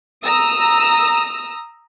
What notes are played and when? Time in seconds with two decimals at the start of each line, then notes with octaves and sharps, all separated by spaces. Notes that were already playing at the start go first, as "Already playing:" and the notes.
0.24 A#5 D#6 E6